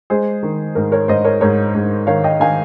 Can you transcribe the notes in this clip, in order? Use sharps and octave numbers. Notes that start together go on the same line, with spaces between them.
G#3 G#4 C5
D#3
G#2 A#4
A#4 C#5
G#2 C5 D#5
A#4 C#5
G#2 A#4 C#5
G#2
D#3 C#5 F5
D#5 G5
D#3 F5 G#5